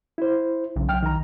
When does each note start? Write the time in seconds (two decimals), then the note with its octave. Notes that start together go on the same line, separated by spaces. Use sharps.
0.18 E4 C5
0.76 B1 C#3
0.89 B1 G5 F6
1.03 D#3 A#5